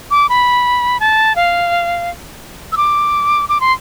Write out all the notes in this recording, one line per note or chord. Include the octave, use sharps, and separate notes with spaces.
D6
B5
A5
F5
E6
D6
D6
C6